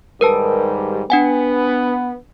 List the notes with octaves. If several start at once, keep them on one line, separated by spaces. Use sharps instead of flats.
G#2 D#3 G3 A#4 B4 A5
B3 D4 F#5 G#5